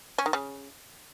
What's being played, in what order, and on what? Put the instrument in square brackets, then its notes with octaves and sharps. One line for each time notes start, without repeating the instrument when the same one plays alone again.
[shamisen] C#4
D#3
C#3